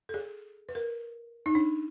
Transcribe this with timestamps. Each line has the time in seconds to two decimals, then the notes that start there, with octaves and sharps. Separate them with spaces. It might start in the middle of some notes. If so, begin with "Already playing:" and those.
0.09 A4
0.14 G#4
0.69 B4
0.75 A#4
1.46 D#4
1.55 D4